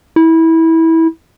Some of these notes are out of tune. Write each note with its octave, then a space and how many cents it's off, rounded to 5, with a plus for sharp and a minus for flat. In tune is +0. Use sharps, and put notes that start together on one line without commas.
E4 -20